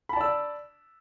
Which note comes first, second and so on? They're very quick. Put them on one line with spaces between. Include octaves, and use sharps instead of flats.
B5 A5 D5 E6